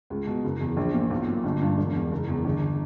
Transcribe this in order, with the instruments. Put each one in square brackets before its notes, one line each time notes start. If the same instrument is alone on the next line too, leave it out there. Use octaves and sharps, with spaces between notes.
[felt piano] C#2
B2
F#1
E2
A#1
A#2
B1
A#2
G1
G2
E1
E2
F#1
E2
G1